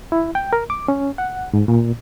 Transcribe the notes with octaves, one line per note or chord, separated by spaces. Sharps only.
E4
G5
A#4
D6
C#4
F#5
G#2
A#2